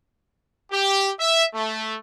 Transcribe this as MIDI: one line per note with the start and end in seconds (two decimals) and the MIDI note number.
0.72 1.10 67
1.19 1.45 76
1.54 1.96 57